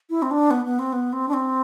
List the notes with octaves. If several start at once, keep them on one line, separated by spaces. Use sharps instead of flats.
E4
C4
D4
B3
B3
C4
B3
C4
D4
C4